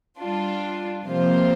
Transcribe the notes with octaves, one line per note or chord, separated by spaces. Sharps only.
G3 D4 F4
C3 F3 A#3 F4 C5